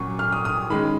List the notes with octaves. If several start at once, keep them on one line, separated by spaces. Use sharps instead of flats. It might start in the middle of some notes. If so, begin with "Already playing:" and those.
Already playing: A#2 F#3 C#4 C#6
F6
D#6
D#6
D#3 G#3 C#4 B5